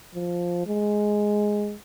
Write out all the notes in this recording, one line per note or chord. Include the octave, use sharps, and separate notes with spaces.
F3
G#3